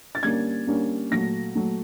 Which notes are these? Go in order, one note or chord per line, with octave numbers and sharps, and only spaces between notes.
A6
D3 G3 A#3 C#4 G#6
D3 G3 A#3 C#4
A#2 F#3 A3 A#6
A#2 F#3 A3